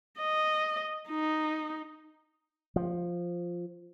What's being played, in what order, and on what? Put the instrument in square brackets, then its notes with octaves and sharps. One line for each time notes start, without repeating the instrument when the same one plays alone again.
[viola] D#5
D#4
[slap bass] F3